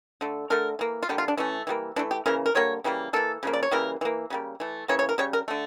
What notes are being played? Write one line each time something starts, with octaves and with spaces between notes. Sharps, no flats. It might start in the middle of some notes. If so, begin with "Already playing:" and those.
D3 A3
D3 A3 A#4
E3 A#3
F4
D3 G3 A#3 G4
F4
D4
E3 A3 C#4
E3 G3 A#3
E3 A3 D4
G4
C#3 E3 A#3 A#4
A#4
D3 G3 A#3 C#5
C#3 E3 G3 A#3
E3 A#3 A4
C#3 F3 A#3
D5
C#5
C#3 E3 G3 A#3 A#4
E3 A#3
C#3 G3 A#3
E3 A3
C#3 E3 A#3 C#5
C#5
A#4
C#3 G3 C#5
A#4
D3 A3